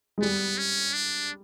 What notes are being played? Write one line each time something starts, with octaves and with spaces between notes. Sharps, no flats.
G#3
G3 B3
C#4
D4